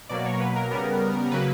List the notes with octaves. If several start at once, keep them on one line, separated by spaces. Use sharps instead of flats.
B2 F#3 A#3 D5
C#5
A#4
B4
A#4
C#3 G3 B3 A#4
C#3 F#3 A#3 B4